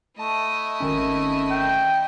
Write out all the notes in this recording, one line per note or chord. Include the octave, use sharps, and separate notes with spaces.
A3 E4 D#5 A5
G#1 D#3 C#4
G5